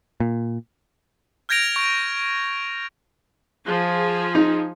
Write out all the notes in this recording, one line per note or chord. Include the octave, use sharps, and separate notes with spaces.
A#2
F6 G6 G#6 A#6 D7 F7
C#6
F3 G#4
D#4